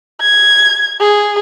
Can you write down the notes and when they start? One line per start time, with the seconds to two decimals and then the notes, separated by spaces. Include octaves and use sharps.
0.21 G#6
1.00 G#4